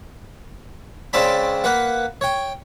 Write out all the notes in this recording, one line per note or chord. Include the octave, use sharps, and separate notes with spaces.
C#2 C#3 C4 D5 A5 B5
A#3 B4 F#5
C#5 G5